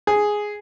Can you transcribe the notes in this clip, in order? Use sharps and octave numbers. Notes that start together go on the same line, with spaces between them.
G#4